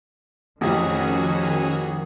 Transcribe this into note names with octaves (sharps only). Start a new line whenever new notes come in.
A1 F2 D#3 F3 C#4 F#4 G#4